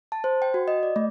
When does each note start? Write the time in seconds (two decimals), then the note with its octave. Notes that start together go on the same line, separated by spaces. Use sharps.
0.12 A5
0.24 C5
0.42 G5
0.54 F#4
0.68 D#5
0.83 D5
0.96 A3